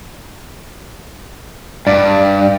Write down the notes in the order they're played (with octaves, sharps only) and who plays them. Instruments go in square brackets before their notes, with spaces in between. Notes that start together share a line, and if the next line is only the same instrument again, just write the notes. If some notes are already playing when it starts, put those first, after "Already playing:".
[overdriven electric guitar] G2 [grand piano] D5